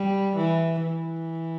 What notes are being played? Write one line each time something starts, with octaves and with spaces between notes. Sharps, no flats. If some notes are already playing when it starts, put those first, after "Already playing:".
Already playing: G3
E3
E3